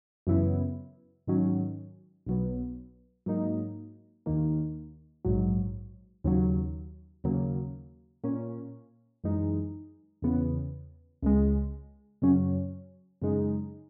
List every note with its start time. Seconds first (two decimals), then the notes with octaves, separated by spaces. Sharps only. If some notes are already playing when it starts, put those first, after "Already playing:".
0.27 F#2 C#3 E3 B3 E4
1.27 G#2 D#3 F#3 C#4
2.26 B1 B2 F#3 B3
3.26 G#2 F#3 A#3 D#4
4.26 D#2 D#3 A#3
5.25 A#1 G#2 F#3
6.24 D#2 C#3 F#3
7.24 D#2 C#3 F#3 A#3
8.24 A#2 A#3 C#4
9.24 F#2 E3 G#3 D#4
10.22 E2 C#3 E3 B3
11.22 C#2 C#3 G#3
12.22 F#2 C#3 F#3 C#4
13.22 F#2 C#3 G#3 D#4